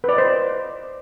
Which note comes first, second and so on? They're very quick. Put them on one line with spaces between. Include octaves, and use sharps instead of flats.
B4 D5 D#5 C5